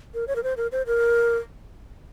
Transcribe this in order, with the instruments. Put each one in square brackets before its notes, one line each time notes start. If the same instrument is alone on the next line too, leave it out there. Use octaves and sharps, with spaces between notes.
[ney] A#4
C#5
A#4
C5
A#4
C5
A#4